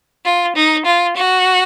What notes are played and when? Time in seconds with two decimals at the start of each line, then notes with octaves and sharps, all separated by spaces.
0.24 F4
0.54 D#4
0.84 F4
1.15 F#4